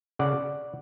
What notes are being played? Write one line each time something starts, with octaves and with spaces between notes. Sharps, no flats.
C#3 D5 F#5